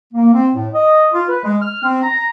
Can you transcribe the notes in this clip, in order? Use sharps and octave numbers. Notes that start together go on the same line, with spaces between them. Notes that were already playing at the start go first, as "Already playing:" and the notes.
A#3
C4
A2
D#5
F4
B4
G#3
F6
C4
A#5